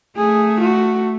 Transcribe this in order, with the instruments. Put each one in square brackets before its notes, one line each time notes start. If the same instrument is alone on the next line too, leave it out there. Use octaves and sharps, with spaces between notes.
[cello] A3 [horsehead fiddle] G#4
[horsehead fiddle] F#4